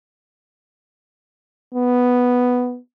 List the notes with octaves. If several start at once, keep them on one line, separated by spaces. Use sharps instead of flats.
B3